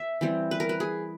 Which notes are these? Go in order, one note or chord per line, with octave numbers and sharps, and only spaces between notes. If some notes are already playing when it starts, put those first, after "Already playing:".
Already playing: E5
E3 G3 C4
B4
A#4
B4
G#4